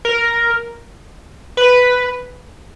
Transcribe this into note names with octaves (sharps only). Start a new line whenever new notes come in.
A#4
B4